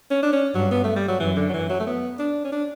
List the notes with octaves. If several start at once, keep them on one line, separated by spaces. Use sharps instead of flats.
C#4
D4
C#4
G2 F#3
B3
A3
G3
F#3
F#2 E3
D3
F#3
E3
F#3
A3
B3
D4
C#4
D4